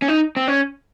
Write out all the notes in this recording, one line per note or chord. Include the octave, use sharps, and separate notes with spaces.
C#4
D#4
C4
C#4